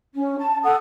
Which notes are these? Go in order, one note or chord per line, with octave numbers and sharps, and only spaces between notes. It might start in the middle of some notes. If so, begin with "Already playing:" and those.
C#4
A5
A4 F#5 D#6